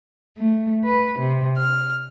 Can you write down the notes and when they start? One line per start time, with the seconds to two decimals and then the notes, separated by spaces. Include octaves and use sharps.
0.38 A3
0.84 B4
1.19 C3
1.57 F6